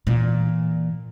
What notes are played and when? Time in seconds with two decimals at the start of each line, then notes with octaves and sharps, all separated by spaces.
0.07 A#2 E3